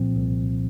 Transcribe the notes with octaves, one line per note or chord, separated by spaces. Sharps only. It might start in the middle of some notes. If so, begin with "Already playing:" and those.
Already playing: C2 A#2 F3 C4
C2